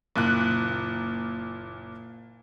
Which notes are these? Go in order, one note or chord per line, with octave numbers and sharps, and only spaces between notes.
F#1 A#2 F#6